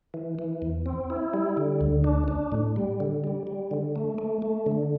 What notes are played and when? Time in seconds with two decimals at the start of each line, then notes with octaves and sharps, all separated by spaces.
0.14 E3
0.39 E3
0.62 E2
0.86 C4
1.10 E4
1.34 G3
1.57 D3
1.81 D2
2.04 D4
2.28 D4
2.52 A2
2.76 G3
3.00 D3
3.24 G3
3.47 G3
3.71 D3
3.96 A3
4.18 A3
4.42 A3
4.66 D3